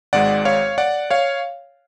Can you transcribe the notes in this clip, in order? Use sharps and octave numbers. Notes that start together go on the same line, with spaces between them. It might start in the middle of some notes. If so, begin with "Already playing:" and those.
G#1 G#2 G#3 D5 F#5
C#5 F5
D5 F#5
C#5 F5